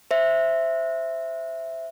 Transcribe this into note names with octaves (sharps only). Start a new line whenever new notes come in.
C5 E5